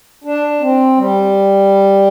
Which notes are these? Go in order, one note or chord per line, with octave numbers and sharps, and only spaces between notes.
D4
C4
G3